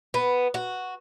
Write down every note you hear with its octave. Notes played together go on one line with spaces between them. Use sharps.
B3
F#4